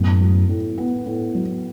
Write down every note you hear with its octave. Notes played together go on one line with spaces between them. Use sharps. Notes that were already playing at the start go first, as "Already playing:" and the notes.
Already playing: F#2 A2 B3
F#3
A2
B3
A2
F#3